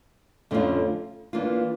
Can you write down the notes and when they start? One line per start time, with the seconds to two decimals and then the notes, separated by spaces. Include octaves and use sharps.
0.51 F2 D3 A3 C#4 F4
1.33 E3 A#3 D4 F4